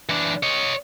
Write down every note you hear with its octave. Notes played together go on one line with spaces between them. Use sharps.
E3 D4
C#5 D#5